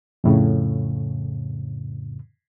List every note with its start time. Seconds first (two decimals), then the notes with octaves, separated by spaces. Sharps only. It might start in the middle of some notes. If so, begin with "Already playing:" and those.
0.24 F2 A2 C#3